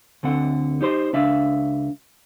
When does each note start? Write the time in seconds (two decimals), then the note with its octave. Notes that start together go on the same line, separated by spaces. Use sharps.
0.23 D2 D3 C4 F#5
0.81 D#4 G4 C5 C6
1.13 C#2 D4 E5 F5